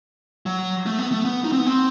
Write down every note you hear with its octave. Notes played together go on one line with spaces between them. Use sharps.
F#3
A3
B3
A3
B3
D#4
C4
B3
C4